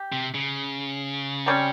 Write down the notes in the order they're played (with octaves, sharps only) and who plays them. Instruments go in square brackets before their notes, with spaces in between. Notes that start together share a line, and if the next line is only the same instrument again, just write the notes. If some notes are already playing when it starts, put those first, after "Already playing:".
Already playing: [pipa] G4
[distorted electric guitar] C3
C#3
[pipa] C3 G3 C#4